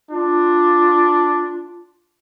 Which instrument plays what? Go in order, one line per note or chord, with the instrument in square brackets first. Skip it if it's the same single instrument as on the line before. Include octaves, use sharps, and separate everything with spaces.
[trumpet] D4 [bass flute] F4